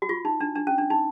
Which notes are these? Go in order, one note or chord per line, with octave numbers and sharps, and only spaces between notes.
F#4
F4
D#4
D4
D4
C#4
D4
D#4